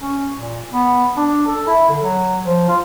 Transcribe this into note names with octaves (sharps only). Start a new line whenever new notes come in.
C#4
A#2
B3
D4
A4
E4
D3
F#3
F3
F4